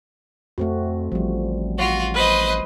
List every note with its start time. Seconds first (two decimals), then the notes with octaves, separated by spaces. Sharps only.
0.58 F2 A3 C4 F#4
1.12 A1 F3 G3
1.78 F4 F#4
2.15 B4 C5 D#5